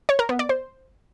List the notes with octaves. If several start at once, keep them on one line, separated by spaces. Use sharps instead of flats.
C#5
A#4
B3
D5
C5